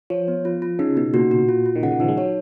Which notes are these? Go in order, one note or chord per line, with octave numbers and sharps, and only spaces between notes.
F3 C#5
B3
F4
F4
C#3 D#4
B2 D#4
A#2 F#4
F#4
F4
F4
D#3
C#3 F#5
D#3
F3 D#4
G#3
F#3 C#5